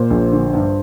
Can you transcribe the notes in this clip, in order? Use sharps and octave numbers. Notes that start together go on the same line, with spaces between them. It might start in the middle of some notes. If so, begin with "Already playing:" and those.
Already playing: A#2 C5
A#1
D3
G2